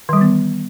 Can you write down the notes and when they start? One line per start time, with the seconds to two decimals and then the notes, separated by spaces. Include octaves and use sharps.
0.09 D#3
0.13 G3
0.17 E3
0.21 B3